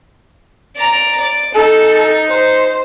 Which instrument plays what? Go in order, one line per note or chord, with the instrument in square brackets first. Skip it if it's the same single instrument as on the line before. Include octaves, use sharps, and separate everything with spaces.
[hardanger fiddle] D5 A#5
D5
[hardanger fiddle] D#4 [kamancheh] A4
[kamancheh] C5